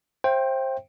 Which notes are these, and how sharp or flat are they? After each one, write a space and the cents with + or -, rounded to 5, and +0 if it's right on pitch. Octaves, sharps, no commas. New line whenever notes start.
C5 +20 E5 +45 G5 +0